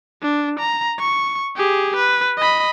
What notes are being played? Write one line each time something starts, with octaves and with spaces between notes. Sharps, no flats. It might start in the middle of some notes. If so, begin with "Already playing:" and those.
D4
A#5
C#6
G4 G#4
B4
D#5 B5